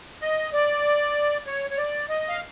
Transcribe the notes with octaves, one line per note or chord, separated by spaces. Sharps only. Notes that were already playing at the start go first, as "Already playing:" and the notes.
D#5
D5
C#5
C#5
D5
D#5
F5